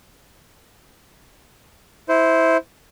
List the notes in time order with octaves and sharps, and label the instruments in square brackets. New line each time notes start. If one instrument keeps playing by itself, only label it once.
[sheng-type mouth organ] E4 C5